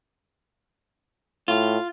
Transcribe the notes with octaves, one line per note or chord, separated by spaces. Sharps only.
A2 F4